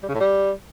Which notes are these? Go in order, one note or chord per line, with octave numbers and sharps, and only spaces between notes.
G3
C#3
A2
G3